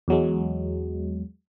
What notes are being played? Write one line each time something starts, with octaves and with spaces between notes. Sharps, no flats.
E2 F#3 G#3